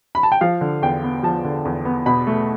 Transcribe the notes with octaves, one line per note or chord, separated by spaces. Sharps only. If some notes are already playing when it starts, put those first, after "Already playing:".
B5
A5
G5
F3 F5
D3
E2 G5
B3
F3 A5
D3
E2
B3
B2 B5
A3